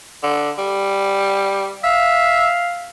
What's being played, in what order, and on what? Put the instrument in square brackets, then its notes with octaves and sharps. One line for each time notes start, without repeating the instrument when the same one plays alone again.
[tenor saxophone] D3
G3
[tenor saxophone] E5 [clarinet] F5